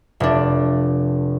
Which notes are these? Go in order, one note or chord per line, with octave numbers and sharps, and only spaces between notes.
F1 D4